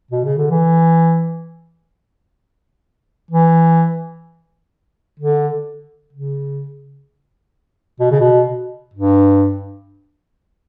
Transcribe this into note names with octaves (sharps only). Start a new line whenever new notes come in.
B2
C#3
D3
E3
E3
D3
C#3
B2
C#3
B2
G2